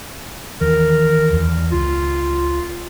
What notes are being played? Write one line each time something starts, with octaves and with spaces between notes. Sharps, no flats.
D#2 E3 A#4
E2
C#2 F4